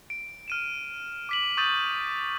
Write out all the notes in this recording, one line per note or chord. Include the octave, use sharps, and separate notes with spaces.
D7
F6 D#7 E7
D6 B6 F#7
C#6 D#6 G6 A6 D#7 F#7